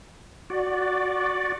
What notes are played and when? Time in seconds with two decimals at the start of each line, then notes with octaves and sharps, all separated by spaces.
0.50 F#4 D5